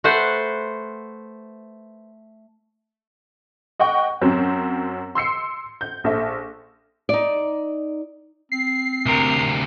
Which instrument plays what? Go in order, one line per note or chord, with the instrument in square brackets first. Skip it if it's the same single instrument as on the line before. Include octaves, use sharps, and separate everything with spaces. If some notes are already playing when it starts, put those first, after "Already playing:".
[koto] A3 B4 C5 F#5
[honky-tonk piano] D#5 F#5 G5 C#6
F#2 F#3 C4
C6 E6 C7 C#7
G6
A#1 A4 E5
[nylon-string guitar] D#4 D5
[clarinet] C4 [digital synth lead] C7
[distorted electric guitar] D2 C3 [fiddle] A#4